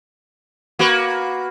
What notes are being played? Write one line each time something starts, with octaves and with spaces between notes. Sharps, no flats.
A#3 F#4 B4